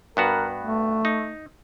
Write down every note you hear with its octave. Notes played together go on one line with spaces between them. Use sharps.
G2 B3 F#4 A#4
A3
D#4